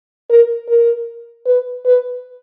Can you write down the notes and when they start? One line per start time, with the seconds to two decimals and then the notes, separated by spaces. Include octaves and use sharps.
0.30 A#4
0.68 A#4
1.46 B4
1.86 B4